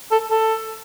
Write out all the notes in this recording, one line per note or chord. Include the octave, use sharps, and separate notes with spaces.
A4
A4